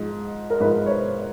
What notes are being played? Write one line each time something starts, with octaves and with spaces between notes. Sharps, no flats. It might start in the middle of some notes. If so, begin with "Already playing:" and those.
Already playing: G#2 F3
A#4
G#2 F3 B4
C#5
C5